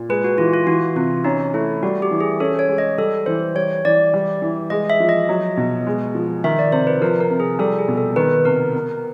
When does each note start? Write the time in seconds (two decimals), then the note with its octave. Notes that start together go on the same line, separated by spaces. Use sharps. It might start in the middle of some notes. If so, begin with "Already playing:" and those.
Already playing: A#2
0.09 G#3 B4
0.24 F#4
0.38 E3 F4
0.54 F4
0.67 E3 F#4
0.96 C3 F4
1.24 C#4 D#4
1.54 A3 E4
1.82 G3 F#4
2.02 G4
2.11 E3
2.20 G#4
2.40 C#4 A4
2.59 C#5
2.69 G#3
2.78 D#5
2.98 G3 A4
3.26 E3 C5
3.55 G3 C#5
3.85 E3 D5
4.14 G3
4.42 E3
4.70 G#3 D#5
4.90 E5
5.00 F3
5.09 D#5
5.29 F#3
5.57 B2
5.87 G#3
6.15 F3
6.44 D#3 E5
6.59 D5
6.72 C3 C5
6.87 B4
7.01 F3 A#4
7.20 A#4
7.30 C3
7.40 G#4
7.59 G3 A4
7.78 G#4
7.88 B2
7.97 A4
8.16 D#3 B4
8.45 C3 A#4
8.75 B3